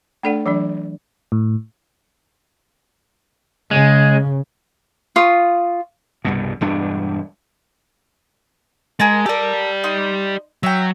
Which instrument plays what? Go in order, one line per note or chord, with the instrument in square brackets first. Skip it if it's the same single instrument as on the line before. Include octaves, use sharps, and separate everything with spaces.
[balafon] A3 D4 A4 D5 F#5
E3 F#3 D4 D5
[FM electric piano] A2
[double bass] C#3 [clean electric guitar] G#3
[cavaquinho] F4 F5 C#6 D#6
[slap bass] C2 G2 B2
E1 G2 D4
[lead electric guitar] G#3 [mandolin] G#4 A#4 A5
[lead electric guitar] G4 D5 [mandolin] A4 A#4
[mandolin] D#4 C6
[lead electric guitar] F#3 [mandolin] E5 G5